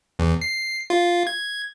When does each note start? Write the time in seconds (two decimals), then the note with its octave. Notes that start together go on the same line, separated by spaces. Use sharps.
0.19 E2
0.41 C7
0.90 F4
1.27 G#6